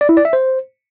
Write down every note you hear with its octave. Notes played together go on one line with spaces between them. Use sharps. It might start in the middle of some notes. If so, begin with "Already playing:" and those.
D5
E4
D5
E5
C5